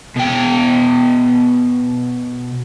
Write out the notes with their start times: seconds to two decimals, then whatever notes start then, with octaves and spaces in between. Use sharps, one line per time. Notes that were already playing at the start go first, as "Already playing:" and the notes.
0.16 B2 G5